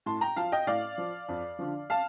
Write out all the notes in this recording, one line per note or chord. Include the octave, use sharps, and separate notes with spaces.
A2 A5 C6
G5 A#5
F3 F5 A5
D#5 G5
A2 D5 F5
F3
F2
D3 F3
F5 A5